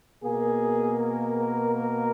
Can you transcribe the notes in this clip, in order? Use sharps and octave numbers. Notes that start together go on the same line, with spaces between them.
B2 A#3 G#4
A#4
A#4
A#4